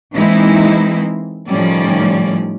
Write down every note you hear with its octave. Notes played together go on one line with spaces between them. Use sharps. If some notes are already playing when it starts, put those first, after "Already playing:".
E3 G#3 A#3 C4 D#4 E4
A2 D#3 F3 G3 C#4 D5